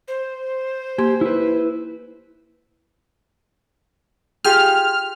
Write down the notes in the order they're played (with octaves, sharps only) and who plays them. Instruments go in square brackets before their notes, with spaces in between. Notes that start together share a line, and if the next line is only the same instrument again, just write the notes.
[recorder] C5
[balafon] A#3 C6 [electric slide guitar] G4
[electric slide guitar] E4 B4
[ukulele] F4 G4 G#4 [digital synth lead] F6